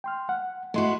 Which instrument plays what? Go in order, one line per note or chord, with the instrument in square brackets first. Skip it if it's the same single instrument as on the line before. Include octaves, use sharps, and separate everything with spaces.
[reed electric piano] G5 C6 F6
F#5
[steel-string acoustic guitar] G#3 E4 F#4 [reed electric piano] A3 C6